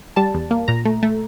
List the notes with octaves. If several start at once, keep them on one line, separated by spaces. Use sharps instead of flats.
G3 A5
E2
A#3
A#2 A#5
A3
A3